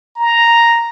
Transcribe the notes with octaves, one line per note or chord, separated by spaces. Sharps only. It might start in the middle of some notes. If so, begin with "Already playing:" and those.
A#5